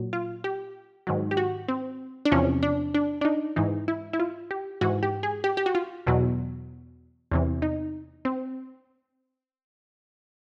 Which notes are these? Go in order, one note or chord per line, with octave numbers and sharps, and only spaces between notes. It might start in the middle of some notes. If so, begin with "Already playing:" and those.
Already playing: A#2 F#3
F4
G4
G#2 D#3 F#3
G4
F#4
C4
D4
E2 C3 F3 C#4
D4
D4
D4
D#4
G#2 E3 D#4
E4
E4
F4
G4
G#2 E3 F#4
G4
G#4
G4
G4
F#4
F4
E2 B2 F#3
E2 C3 E3
D#4
C4